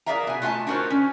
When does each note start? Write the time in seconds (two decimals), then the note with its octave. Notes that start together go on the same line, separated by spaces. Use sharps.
0.06 G#4 A#4 D5 E5 F5 A#5
0.27 B2 G#5
0.42 A3 F4 D#5 F5 G#5 A5
0.67 D4 D#4 F#4 A#4 C5 C#5
0.90 C#4